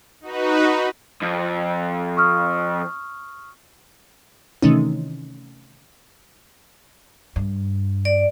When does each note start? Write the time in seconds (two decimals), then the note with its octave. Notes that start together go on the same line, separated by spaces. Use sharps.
0.21 D#4 F#4 B4
1.22 F2
2.17 C#6 D#6 F6
4.62 C3 D#3 E3 A3 C#4 D#4
7.36 G2
8.05 D5